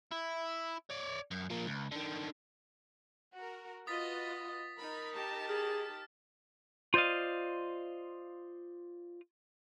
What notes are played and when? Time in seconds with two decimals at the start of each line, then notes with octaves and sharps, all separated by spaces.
0.11 E4
0.90 C#5 D5
1.31 F#2
1.50 F3 A#3
1.66 C#2
1.92 D3 D#3
3.35 F#4 A#4
3.87 F4 F#4 B4 D#5 D#6 A6 B6
4.79 D#4 A#4 B5
5.14 G4 A5
5.49 G#4 F6
6.94 F4 C5 D5 D#5 F5